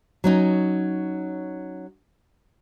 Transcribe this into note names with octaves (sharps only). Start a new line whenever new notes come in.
F#3 C#4 D#4